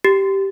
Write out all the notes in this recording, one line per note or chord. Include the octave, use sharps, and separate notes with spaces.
G4